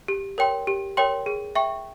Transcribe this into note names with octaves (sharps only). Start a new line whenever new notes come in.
G4
A#4 C#5 G5 C6
G4
A#4 C#5 G5 C6
G#4
E5 G5 C#6